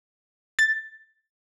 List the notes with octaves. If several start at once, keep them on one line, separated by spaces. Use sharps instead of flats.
A6